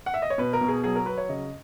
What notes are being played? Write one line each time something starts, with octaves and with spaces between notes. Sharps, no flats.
F#5
E5
D#5
C#5
B2 B4
A#4
B2
G#4
F#3 G#4
A#4
F#3 B4
C#5
C#3 D#5